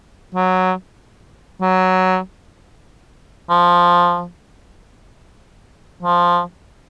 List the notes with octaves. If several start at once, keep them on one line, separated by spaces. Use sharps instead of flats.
F#3
F#3
F3
F3